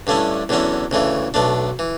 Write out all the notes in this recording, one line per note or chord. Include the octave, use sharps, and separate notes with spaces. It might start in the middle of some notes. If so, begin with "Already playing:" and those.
G2 D3 A3 C#4 E4
E2 D3 F#3 C#4 E4
D2 C#3 E3 A3
B1 B2 A3 D4
E3